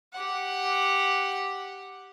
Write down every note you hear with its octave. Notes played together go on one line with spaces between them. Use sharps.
G4 F#5